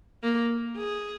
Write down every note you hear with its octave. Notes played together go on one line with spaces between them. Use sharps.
A#3
G#4